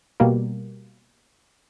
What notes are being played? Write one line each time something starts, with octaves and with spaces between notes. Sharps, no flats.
B2 G3 A#3